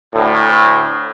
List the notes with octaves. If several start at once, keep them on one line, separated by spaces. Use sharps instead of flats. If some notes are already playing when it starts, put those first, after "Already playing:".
D2 A2